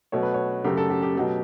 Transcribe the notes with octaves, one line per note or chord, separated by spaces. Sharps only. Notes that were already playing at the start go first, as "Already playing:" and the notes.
B2 F#3 A3 C#5
B4
C#5
F#2 C#3 F#3 A3 G4
A4
G4
G4
B2 F#3 A3